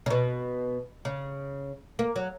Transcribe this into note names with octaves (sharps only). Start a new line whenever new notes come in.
C#3
B2
C#3
A#3
F#3